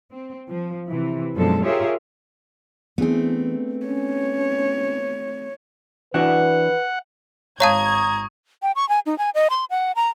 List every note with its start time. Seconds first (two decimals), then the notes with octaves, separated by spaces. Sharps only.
0.12 C4
0.49 F3
0.89 C3 E3
1.35 F#2 B2 F3 G#3 D4 A4
1.65 F4 G4 G#4 A#4 C#5 E5
2.98 E3 A3 B3 C4 D4 G#4
3.86 C#4 C#5
6.14 E3 D4 F#4 B4 F#5
7.60 G#1 C#5 F5 A5 A#5 C#6 D#6 G#6
8.62 G5
8.76 C#6
8.89 G#5
9.06 D#4
9.18 G#5
9.35 D#5
9.50 C6
9.70 F#5
9.96 A#5